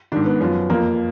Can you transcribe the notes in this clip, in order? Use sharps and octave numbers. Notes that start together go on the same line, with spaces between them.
G#2 D#3 D4
B3
F#2 F3
F2 F3 A#3